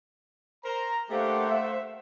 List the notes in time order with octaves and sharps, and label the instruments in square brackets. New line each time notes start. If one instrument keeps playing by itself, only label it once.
[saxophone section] A#4 C5 [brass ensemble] A#5
[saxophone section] A3 [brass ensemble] A#3 D4 G4 [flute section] C5 F5 F#5
[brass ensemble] E5